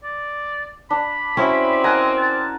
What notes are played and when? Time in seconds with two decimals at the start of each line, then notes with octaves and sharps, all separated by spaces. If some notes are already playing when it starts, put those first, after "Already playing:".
0.03 D5
0.90 D4 B5
1.37 C4 C#4 E4 F#4
1.84 A#4 D#5 F#5 G#5
2.17 A5